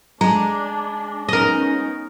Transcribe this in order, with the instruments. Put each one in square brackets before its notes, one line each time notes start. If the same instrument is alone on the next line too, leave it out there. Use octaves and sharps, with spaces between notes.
[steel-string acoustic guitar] G#3 [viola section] D4 [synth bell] A#5
[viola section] B3 C#4 D#4 [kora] A#4 D#5